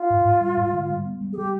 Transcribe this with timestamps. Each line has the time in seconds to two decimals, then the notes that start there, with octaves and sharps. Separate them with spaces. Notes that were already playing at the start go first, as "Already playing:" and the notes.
Already playing: F4
0.10 G#2
0.25 G#2
0.41 G3
0.57 G#2
0.73 D3
0.90 G3
1.05 B3
1.21 G3
1.33 G#4
1.37 G3 G4